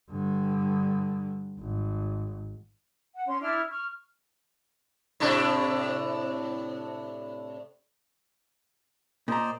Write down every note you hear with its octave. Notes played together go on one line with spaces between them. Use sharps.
G2 D3
G#1
F#5
C#4 C6
D4 E4 F6
C#6 F6
A2 C3 D4
A#2 C5 D5 D#5 A#5